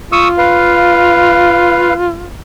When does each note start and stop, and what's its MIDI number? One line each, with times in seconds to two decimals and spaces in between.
0.12 2.27 65
0.12 0.28 85
0.12 0.28 87
0.12 0.28 88
0.38 1.94 71
0.38 1.94 77